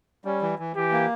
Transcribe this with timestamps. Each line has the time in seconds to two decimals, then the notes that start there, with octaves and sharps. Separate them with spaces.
0.25 G3 C#4
0.42 E3
0.59 E3
0.76 E3 G4
0.92 A#3